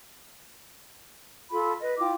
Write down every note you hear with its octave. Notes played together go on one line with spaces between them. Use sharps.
F4 A4 B5
B4 D#5
E4 F4 G5 D6